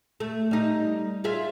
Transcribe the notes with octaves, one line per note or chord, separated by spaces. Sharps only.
A3
G3 D#4
F4 G#4 E5